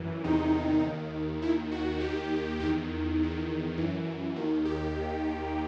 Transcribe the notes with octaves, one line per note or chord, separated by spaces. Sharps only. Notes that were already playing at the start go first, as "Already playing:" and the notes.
Already playing: F#2 E3
E2 C3 D#3 D#4
D#2 D#3
D#2 D#3 E4
F#4
D#2 D#3 G4
E2 D#3 G4
E2 D#3
F#2 E3
D#2 D#3
G4